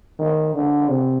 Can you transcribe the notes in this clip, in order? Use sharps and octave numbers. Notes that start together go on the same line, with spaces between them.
D#3
D3
C3